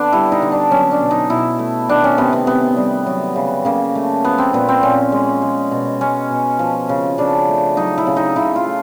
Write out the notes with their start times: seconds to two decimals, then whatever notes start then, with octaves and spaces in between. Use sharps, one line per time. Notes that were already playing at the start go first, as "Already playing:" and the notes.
Already playing: D3 B3 D4
0.12 G3 E4
0.32 D#4
0.42 D3
0.52 D4
0.71 F#3 C#4
0.91 D4
1.01 B2
1.11 D#4
1.30 B2 E4
1.59 A3
1.89 D#3 D4
2.04 C#4
2.18 C3 B3
2.33 B3
2.47 C3 B3
2.76 G3
3.07 F#3
3.36 C#3
3.65 C#3 A#3
3.95 A3
4.24 F3 B3
4.38 C4
4.53 A#2 B3
4.69 C4
4.83 A#2 C#4
5.12 G#3
5.42 G#3
5.71 B2
6.01 G#3 C#4
6.31 B2
6.59 F3
6.89 C#3
7.18 C#3 D4
7.49 A3
7.77 F#3 D#4
7.98 E4
8.07 C#3
8.17 D#4
8.36 C#3 E4
8.56 F4
8.66 A3